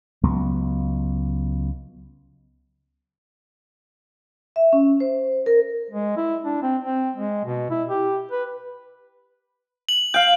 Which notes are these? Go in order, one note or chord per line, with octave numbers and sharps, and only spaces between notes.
C#2 F#3 B3
E5
C#4
C5
A#4
G#3
E4
D4
C4
C4
G#3
B2
E4
G4
B4
F#7
F5 G5 G6